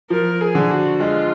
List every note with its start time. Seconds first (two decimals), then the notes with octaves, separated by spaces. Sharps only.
0.10 F3 A#4
0.41 G#4
0.55 D3
0.71 F#4
1.00 G#3 F4